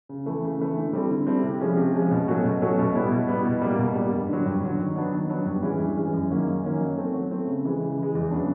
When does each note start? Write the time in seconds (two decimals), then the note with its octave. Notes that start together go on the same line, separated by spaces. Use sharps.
0.09 C#3
0.26 E3 A3
0.44 C#3
0.60 E3 A3
0.77 D3
0.93 G3 C4 E4 A4
1.11 D3
1.27 G3 C4 E4 A4
1.43 C3
1.61 F3 G#3 C#4
1.77 C3
1.95 F3 G#3 C#4
2.11 B2
2.28 F#3 A3 C#4 F#4
2.45 B2
2.62 F#3 A3 C#4 F#4
2.78 B2
2.95 G3 B3 E4
3.12 B2
3.28 G3 B3 E4
3.45 B2
3.61 G3 A#3
3.79 B2
3.95 G3 A#3
4.13 G2
4.29 D3 F#3
4.46 G2
4.62 D3 F#3
4.79 D#3
4.96 F#3 B3 D4
5.12 D#3
5.29 F#3 B3 D4
5.46 G2
5.63 E3 G#3 C#4
5.80 G2
5.96 E3 G#3 C#4
6.13 F#2
6.30 D#3 F#3 A#3 C#4
6.46 F#2
6.63 D#3 F#3 A#3 C#4
6.80 F#3
6.97 A3 C4
7.14 F#3
7.31 A3 C4
7.47 C#3
7.65 E3 G#3
7.81 C#3
7.98 E3
8.03 G#3
8.15 E2
8.31 C#3 F#3 B3 D4